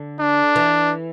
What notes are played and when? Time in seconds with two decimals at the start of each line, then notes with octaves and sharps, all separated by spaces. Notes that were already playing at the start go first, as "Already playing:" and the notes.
Already playing: D3
0.20 D4
0.56 E3